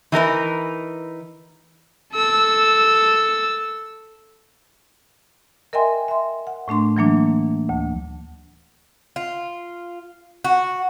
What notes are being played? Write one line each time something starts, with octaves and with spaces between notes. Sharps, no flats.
E3 D#4 A#4 B4
A4 E6
A#4 D#5 E5 G5 G#5 C6
E5 C6
F#5
A2 A3 D4 C6
E3 F#3 A#3 D4
D2
F4
F#4